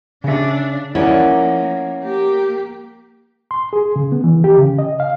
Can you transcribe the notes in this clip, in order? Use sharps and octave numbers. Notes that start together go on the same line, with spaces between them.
C#3 D4 E5
F3 A#3 C#4 E4 A#4 D5 F#5
A#3 G4
C6
G#4
C#3
B3
E3
G4
C#3
D#5
F5